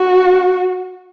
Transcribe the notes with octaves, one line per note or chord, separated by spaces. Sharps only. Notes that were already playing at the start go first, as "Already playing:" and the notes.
Already playing: F#4